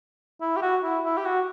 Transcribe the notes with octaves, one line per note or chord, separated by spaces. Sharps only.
E4
G4
F#4
E4
E4
G4
F#4